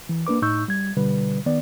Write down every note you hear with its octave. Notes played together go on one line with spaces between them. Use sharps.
E3
A#3 D4 B4 D6
A2 D#4 C#6 E6 G6
G3 G#6
B2 D3 G3 B4
D#3 B3 D5